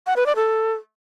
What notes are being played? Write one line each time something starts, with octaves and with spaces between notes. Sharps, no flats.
F#5
B4
D5
A4